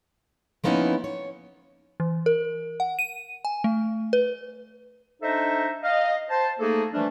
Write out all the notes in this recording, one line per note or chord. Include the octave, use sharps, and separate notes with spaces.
F3 A#3 B3 C#4 D#4 E4
C#5
E3
A#4
F#5
D#7
G#5
A3
B4
D4 D#4 A4 C5 D#5 E5
D#5 F5
C5 A5
A3 A#3 D#4 G#4 A4
E3 F3 G3 A3 D4